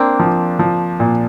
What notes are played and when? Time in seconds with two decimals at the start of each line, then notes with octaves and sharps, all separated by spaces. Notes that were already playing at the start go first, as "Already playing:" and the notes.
Already playing: A#3 C4 D4
0.20 F3
0.59 F3
1.00 A#2